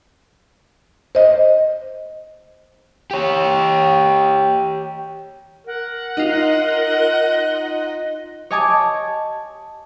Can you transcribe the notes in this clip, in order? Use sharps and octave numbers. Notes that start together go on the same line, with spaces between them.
C5 D#5
G4 C#5
A#4 F#5
D#4 F4 D#5
C#5 D#5 G#5 A5 D6 G#6